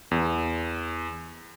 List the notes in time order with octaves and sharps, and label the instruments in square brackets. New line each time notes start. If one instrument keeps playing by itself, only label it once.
[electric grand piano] E2